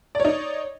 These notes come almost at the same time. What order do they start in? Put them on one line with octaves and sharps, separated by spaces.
D5 C#5 D#4